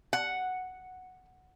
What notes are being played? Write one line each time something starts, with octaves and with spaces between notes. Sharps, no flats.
F#5